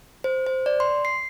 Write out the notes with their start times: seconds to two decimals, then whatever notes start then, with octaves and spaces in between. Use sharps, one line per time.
0.24 C5
0.46 C5
0.66 D5
0.80 C6
1.05 C7